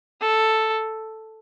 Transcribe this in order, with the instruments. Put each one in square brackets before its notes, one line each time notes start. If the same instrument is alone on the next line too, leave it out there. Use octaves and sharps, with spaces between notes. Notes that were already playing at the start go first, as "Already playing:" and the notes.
[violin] A4